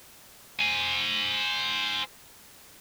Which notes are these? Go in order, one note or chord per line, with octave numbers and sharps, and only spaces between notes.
C5 G#5